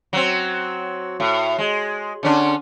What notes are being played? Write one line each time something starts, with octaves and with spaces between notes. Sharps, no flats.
F#3 C4
A2
G#3
D3 C#4 D4